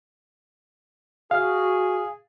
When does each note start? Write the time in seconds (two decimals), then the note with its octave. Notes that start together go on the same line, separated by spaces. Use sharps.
1.31 F#4 G#4 F5